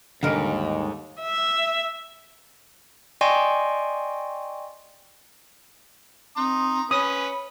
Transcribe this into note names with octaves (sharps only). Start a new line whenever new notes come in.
D#2 G#2 D3 G3 A#4 D#5 D7
E5
D5 D#5 G5 G#5 C6 C#6
C4 A#5 C6 D#6
C#4 B4 C#5 B5 D#6